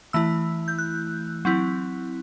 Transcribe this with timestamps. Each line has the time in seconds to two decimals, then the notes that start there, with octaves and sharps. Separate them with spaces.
0.13 E3 A3 E4 E6
0.68 G6
0.79 F#6
1.45 F#3 C4 E4